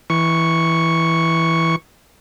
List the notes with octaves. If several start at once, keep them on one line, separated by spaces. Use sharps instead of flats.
E3 C#6